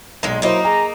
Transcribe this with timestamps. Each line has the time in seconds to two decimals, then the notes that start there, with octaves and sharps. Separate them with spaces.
0.23 B1 A#2 G#3
0.42 F#3 A#3 D#4 E4 C5
0.64 G#4 A#5